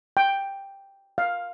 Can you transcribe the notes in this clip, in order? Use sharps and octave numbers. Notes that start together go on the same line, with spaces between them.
G5
F5